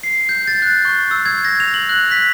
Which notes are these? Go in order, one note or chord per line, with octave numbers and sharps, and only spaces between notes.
C7
G6
A6
F#6
C#6
E6
G#6
A#6
F7
F#7
F#6
B6